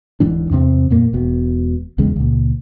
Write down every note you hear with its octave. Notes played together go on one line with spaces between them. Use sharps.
D1 G#2 E3 D4
E2 C3 C4
F2 A#2 A#3
E1 B2
B1 E2 C#3 G#3
C#2 A#2